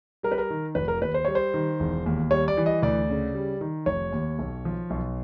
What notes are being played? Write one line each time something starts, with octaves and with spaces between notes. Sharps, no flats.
G3 A#4
B4
A#4
D#3
F1 B4
A#4
D#2 B4
C5
G3 C#5
C5
D#3
E1
D#2
G3 C#5
D5
E3
D#5
D2 D5
C#3
G3
D#3
F1 C#5
D#2
B1
F3
B1